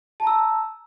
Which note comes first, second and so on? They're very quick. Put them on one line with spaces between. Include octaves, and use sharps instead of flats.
A5 A#5 E6